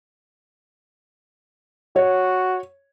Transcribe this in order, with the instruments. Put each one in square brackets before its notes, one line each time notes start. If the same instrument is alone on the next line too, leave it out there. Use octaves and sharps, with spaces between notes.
[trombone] F#4 [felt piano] C#5